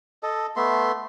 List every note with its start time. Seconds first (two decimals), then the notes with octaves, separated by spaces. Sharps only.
0.23 A4 D#5
0.56 A3 B3 E5 C6